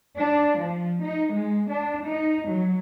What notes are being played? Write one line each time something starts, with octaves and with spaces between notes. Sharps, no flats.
D4
F3
D#4
G#3
D4
D#4
F#3